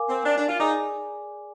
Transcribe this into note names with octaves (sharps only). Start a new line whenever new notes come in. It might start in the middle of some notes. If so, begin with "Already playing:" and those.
Already playing: A#4 F5 G#5 D6
C4
D4
D4
F4
D#4 G#4 D5 G#5 D6